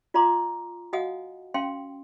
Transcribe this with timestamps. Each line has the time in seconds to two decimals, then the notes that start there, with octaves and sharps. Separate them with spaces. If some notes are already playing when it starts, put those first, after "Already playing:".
0.14 F4 D5 F5 A#5 C6 D6
0.93 F#4 D#5 F5 F#5 G#5 D#6
1.54 C#4 F5 G5 C6